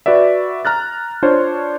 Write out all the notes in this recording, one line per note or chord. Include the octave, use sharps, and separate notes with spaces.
F#4 B4 D5 E5
A#5 F6 F#6 A6
D4 F4 C5 C#5